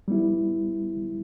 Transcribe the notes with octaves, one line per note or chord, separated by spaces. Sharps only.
G3 B3 E4